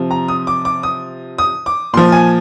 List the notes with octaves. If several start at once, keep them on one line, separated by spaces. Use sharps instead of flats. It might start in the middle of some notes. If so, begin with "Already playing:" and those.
Already playing: C3 F3
A#5
D#6
D6
D6
D#6
D#6
D6
A#2 F3 C6
G#5